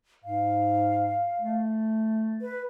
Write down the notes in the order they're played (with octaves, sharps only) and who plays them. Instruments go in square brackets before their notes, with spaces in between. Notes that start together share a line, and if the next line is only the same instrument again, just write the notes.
[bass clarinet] G#2 [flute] F5
[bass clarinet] A3
[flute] B4